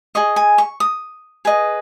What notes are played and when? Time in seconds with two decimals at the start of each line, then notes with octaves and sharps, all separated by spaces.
0.15 G#4 D#5 C#6
0.36 G#5
0.58 C#6
0.80 D#6
1.45 G#4 B4 D#5